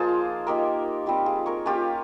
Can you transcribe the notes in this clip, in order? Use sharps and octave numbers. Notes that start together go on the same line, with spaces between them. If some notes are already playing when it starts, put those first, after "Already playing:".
Already playing: F3 A#3 D#4 F4 G#4 C5
A#3 D#4 G4 A#4
G3 C4 F4 G4
F4 G#4
A#4 C#5
A#3 C#4 F4 G4